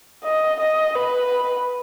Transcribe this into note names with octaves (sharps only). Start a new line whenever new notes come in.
D#5
D#5
B4